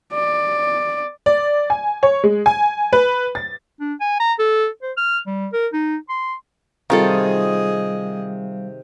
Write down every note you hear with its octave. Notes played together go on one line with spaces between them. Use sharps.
D5
D5
G#5
C#5
G#3
G#5
B4
A6
D4
G#5
A#5
A4
C5
F6
G3
A#4
D#4
C6
C3 D#3 G3 F4 G#4 A4 D#5 F5